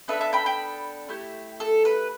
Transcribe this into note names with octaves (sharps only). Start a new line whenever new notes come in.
B3 D4 A4 B4 E5
E5 A5
G5 B5
G5 B5
A3 E4 G4
A4
B4